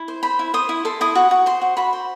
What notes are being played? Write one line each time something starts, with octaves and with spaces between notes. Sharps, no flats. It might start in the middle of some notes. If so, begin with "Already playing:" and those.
Already playing: E4
C5
C5 B5
E4
C5 D#6
E4
A4 C6
E4 D#6
F#4
F#4
C5 C6
F#4
F#4 B5
C5